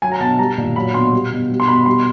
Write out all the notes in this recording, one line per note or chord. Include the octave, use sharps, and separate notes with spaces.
F#3 G#5
A#5
B2 A5
G3 A#5
A#2
F#3 B5
B2 C6
G3
B2
G3
C6
B2 B5
G3 C6